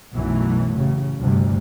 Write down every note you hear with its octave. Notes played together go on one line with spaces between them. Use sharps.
B1 F#2 E3 F#3 A3
A1 C#3
G1 D2 G2 C3 G3